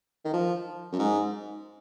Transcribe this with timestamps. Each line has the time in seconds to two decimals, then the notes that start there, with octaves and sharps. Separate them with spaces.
0.25 D#3
0.33 F3
0.92 F#2
0.99 G#2